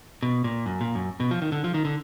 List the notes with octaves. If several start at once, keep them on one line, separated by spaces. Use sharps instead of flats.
B2
A#2
F#2
A#2
F#2
B2
F3
D#3
D3
F3
D#3
D3